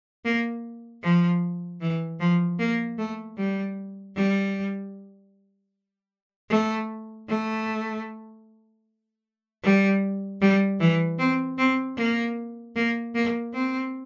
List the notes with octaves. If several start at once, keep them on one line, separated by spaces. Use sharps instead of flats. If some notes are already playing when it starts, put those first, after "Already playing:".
A#3
F3
E3
F3
A#3
A3
G3
G3
A3
A3
G3
G3
E3
C4
C4
A#3
A#3
A#3
C4